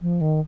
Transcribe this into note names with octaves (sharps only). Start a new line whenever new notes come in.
F3
D#3